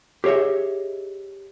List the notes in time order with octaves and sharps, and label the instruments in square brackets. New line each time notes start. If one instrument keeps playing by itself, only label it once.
[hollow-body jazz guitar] G4 G#4 C#5 D#5 E5